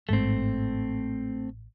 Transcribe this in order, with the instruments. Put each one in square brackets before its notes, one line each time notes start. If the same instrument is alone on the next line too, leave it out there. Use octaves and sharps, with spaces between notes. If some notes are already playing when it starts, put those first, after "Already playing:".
[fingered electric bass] A1 G#2 G#3 [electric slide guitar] A3 C4